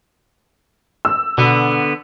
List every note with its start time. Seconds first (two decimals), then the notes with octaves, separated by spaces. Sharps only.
1.05 E6
1.38 B2 D3 B3